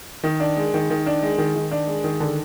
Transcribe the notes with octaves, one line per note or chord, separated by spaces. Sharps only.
D#3
D4
G#3
D#3
D#3
D4
G#3
D#3
D#3
D4
G#3
D#3
D3